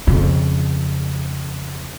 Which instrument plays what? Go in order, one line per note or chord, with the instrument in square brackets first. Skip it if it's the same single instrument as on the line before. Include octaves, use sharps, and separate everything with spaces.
[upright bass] F2 C#3